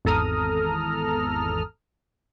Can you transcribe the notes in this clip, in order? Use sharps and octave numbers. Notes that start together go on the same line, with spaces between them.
G#1 E2 A4 A#5 D#6 F6